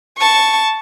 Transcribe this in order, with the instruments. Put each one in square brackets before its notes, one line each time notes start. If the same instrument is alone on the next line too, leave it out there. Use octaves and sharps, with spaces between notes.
[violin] A5 C#6